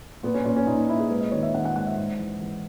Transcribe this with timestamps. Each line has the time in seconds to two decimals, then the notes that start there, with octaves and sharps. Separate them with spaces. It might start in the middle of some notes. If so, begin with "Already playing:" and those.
0.23 A#2 B3
0.34 C#4
0.45 A#2 C#4
0.56 C#4
0.67 A#2 D#4
0.78 D#4
0.89 A#2 E4
0.99 G#4
1.10 G#2 B4
1.21 D#5
1.32 D#3 C#5
1.43 E5
1.54 D#3 F#5
1.65 F#5
1.76 G#2 F#5
1.87 E5
1.97 G#2
2.19 E3
2.41 E3